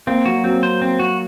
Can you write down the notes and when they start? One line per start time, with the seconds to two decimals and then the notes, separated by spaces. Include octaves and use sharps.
0.07 A#3 C4
0.26 F#3 F#4
0.44 F#3 C4
0.63 C5
0.82 C4
0.99 F#4